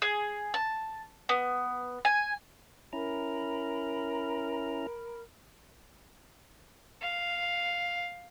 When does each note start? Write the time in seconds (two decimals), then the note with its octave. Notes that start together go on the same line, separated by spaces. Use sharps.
0.02 G#4
0.54 A5
1.29 B3
2.05 G#5
2.93 C#4 E4 A#4 A#5 B5
7.02 F5